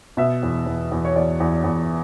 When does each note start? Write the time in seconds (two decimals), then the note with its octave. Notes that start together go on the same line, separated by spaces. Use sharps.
0.17 B2 E5
0.43 E2
0.66 E2
0.92 E2
1.05 C#5
1.16 E2 D5
1.40 E2
1.64 E2